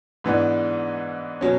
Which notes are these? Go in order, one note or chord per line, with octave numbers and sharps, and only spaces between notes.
G#2 E3 B3 D4
B2 F#3 C#4